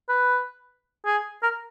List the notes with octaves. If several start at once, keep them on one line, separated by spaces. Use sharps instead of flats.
B4
G#4
A#4